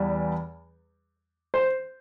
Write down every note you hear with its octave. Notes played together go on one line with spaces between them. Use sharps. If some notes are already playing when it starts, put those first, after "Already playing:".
Already playing: E2 G3
C5